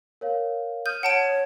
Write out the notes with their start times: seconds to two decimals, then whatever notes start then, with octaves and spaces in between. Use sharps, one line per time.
0.21 A#4 C#5 F5
0.86 D#6 F6 G6 D#7
1.03 C#5 F#5 A5 D7